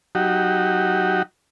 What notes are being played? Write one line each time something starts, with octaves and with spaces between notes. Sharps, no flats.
F#3 D#4 F#4 G4